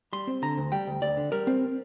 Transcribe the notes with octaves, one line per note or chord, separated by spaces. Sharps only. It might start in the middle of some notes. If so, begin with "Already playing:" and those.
G3 C6
C4
D3 A#5
D2
G3 G5
D2
D2 D5
D3
G3 A#4
C4